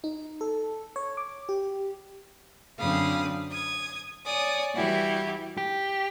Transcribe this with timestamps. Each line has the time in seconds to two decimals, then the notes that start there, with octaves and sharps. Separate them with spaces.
0.04 D#4
0.41 A4
0.96 C#5
1.17 D6
1.49 G4
2.77 F#2 D3 C4 F5 B5 D#6
3.50 D#6 G#6
4.25 C#5 D5 G#5 D#6
4.74 E3 G3 E4 F#4 G4
5.57 G4